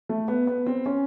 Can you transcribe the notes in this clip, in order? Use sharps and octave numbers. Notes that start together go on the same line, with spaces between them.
A3
B3
B3
C4
C#4